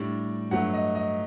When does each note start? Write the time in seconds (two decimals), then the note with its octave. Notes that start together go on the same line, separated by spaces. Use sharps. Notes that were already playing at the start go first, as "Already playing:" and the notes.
Already playing: A2 G3 D4
0.51 G2 F#3 A3 F#5
0.74 D#5
0.95 D#5